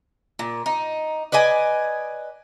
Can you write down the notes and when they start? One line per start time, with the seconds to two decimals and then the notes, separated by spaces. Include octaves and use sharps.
0.39 A#2
0.66 D#4
1.32 B4 D5 D#5 G#5